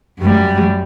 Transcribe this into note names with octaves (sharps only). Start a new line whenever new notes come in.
F#2 G3